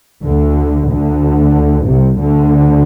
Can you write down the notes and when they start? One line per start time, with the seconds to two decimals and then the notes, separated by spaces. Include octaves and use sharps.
0.24 D2 D3
0.90 D2 D3
1.87 C2 C3
2.19 D2 D3